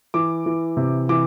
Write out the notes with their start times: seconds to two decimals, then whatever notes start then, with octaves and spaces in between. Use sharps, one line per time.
0.14 E3 D6
0.46 E3
0.77 C3
1.09 E3 D6